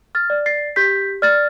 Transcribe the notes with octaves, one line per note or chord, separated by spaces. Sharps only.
F6 A6
D5
A6 C7
G4 G6 B6
D5 F6 A6